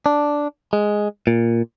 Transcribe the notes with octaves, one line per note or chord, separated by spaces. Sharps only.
D4
G#3
A#2